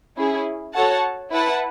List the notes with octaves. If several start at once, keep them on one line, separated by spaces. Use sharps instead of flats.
C#4 E4 G#4
F#4 A4 C#5 F#5 A5
E4 B4 F#5 A5